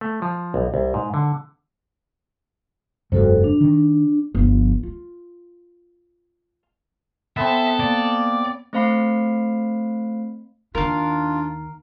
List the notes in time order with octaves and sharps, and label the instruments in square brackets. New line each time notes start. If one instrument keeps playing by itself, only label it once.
[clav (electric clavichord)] A3
F3
B1
C2
G#2
D3
[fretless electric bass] F1 G2 C3 [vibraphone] F#4 A4 C5
[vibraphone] D4
[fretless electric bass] D#3
[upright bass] G1 F3
F4
[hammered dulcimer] B3 C4 [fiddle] A4 [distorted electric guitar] E5
[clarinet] A#3 [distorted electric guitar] D5
[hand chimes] A3 C4 C5 F5 B5 C7
[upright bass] D#2 D#3 [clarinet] D4 [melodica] F4 [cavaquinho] A#4 F5